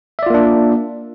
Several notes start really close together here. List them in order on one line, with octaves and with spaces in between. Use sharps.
E5 D5 F4 A#3 D4